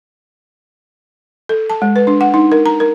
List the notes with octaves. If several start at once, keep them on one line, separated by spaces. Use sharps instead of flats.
A4
A5
G#3
B4
D4
F#5
D#4
A#4
A#5
A#4